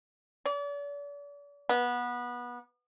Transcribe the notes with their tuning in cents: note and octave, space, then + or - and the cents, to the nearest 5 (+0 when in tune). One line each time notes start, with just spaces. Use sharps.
D5 -40
B3 -20